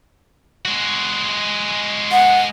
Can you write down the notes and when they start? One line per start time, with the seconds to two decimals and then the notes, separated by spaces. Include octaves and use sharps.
0.65 G#3 F#4
2.12 F#5